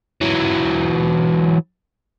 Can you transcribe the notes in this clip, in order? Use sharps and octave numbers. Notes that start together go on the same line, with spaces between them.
E3 F#3